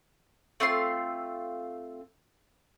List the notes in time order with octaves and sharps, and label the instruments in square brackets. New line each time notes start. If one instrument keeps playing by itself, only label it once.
[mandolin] A3 C4 F4 C6